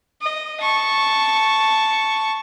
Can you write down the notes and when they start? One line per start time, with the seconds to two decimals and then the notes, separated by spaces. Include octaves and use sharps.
0.22 D#5
0.61 A5 C#6